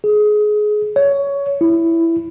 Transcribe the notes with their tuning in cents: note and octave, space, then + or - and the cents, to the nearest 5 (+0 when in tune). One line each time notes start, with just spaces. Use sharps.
G#4 +20
C#5 +15
E4 +5